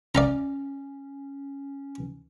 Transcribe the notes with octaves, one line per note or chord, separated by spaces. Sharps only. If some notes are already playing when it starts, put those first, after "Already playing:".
C#4 D5 F5 A#5